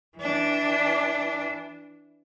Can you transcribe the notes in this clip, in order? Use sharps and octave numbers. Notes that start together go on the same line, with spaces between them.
E3 D4